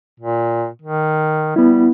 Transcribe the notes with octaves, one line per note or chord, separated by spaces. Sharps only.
A#2
D#3
G3 B3 E4